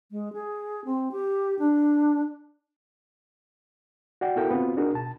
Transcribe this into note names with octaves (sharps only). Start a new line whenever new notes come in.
G#3
G#4
C4
G4
D4
F#4 D5 F#5 G5
B3 E4 F#4 A4 A#4 G5
B3 C4 F4 F#4
D4 D#4 F#4 G#4 A#4
B2 A5